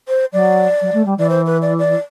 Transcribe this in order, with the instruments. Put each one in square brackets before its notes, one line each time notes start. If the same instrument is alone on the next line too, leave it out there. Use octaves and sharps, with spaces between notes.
[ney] C5
[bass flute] F#3 [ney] D5
[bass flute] F#3
A3
G3
[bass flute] E3 [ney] D5
[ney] C5
B4
D5
D5